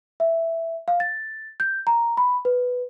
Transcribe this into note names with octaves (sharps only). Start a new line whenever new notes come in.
E5
F5
A6
G6
A#5
B5
B4